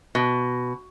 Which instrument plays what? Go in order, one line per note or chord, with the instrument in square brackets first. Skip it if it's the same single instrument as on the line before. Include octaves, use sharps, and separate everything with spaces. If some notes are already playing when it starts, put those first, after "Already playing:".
[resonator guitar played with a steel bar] B2